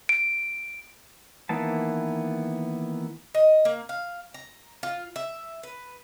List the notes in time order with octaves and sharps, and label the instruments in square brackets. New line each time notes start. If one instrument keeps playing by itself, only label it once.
[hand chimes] D7
[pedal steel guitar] D#3 E3 A#3 B3 A5
[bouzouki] D#5
A#3
F5
A#5
F4
E5
B4